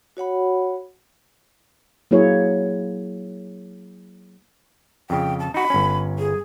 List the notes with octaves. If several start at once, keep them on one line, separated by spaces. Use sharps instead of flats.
F#4 C#5 F#5 B5
F#3 A#3 E4 G#4 C#5
F2 C#3 G5
A5
D#4 F#4 B5
G1 C#4
G#4